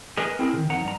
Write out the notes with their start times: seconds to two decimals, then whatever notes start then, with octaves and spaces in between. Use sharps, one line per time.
0.17 G#4 A#4 B4 D#5
0.39 C4 E4 G4 G#4 A#4
0.53 C3 D#3
0.70 F2 D#4 F#5 A#5
0.83 G2 A#5